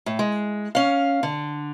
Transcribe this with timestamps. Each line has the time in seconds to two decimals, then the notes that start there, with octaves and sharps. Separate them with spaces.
0.06 A2
0.19 G#3
0.75 C#4 F5
1.23 D3